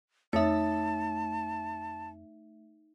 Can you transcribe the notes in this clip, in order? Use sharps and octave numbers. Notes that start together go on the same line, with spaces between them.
F2 A3 D#4 C#5 E5 A5